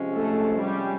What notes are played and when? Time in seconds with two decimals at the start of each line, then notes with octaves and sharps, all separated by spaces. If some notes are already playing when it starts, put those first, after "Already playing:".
Already playing: C3 F3 G#3 C#4
0.15 A3 A4
0.62 G3 G4